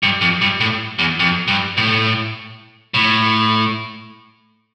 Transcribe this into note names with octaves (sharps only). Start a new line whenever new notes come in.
G2
F2
G2
A2
E2
F2
G2
A2
A2